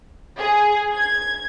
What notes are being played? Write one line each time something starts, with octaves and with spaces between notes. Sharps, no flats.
G#4
G#6